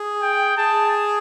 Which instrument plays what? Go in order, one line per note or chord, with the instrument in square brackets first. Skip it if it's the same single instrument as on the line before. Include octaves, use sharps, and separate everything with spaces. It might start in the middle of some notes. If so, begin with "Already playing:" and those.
Already playing: [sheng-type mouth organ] G#4
[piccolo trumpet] G5
[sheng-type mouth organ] G#4 [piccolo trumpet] A5